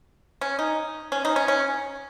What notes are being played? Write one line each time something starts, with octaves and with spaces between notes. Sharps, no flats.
C#4
D#4
C#4
D#4
C#4
C#4